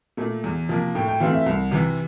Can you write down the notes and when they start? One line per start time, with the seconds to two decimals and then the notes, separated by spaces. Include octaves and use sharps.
0.17 A#2 A3
0.44 E2
0.69 C3 F3 A#3
0.95 A2 G5
1.08 G5
1.20 E3 A3 C4 F5
1.33 E5
1.46 C2
1.71 C3 E3